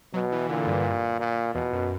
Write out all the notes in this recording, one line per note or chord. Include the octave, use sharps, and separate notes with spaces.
B2 F#3
E3
A#2 D3
G2
A#2
E2 B2
F#2